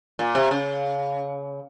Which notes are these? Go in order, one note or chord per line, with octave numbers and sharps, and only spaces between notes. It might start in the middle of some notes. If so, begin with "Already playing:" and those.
A#2
C3
C#3